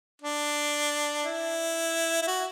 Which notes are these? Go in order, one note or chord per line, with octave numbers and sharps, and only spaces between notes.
D4
E4
E4
F#4